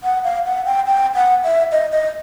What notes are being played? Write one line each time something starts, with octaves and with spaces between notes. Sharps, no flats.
F#5
F5
F#5
G5
G5
F#5
E5
D#5
D#5